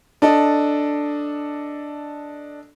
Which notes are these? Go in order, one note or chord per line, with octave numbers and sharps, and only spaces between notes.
D4 A4 D#5